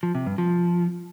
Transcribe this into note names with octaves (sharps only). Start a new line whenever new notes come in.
F3
C3
G2
F3